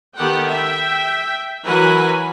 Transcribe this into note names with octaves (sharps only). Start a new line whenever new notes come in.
D#3 B3 G4 A4 F#5 G5
E5 G5
E3 F#3 A#4 B4 F#5 G#5